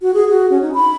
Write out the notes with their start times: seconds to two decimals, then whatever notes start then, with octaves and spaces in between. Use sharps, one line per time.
0.02 F#4
0.14 G#4
0.30 F#4
0.50 C#4
0.62 D#4
0.74 B5